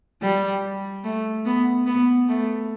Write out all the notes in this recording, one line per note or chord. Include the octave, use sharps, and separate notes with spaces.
G3
A3
B3
B3
A3